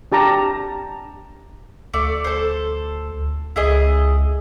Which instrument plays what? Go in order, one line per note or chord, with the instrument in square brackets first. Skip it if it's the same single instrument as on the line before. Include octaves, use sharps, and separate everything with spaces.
[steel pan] D4 G4 A5 A#5
[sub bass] D2 [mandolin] A3 D5
[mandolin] A4 C5
[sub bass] C#2 [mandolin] E4 G#4 D#5